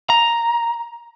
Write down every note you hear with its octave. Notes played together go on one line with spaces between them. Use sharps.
A#5